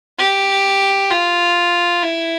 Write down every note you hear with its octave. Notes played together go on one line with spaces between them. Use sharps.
G4
F4
E4